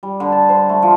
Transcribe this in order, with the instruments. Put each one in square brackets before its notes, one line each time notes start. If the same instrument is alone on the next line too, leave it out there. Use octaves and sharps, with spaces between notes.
[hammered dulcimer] G3
D3
A5
C5
A3
F3